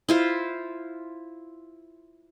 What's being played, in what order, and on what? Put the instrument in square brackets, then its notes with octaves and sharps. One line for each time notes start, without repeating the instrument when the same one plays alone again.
[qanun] E4 F4 C5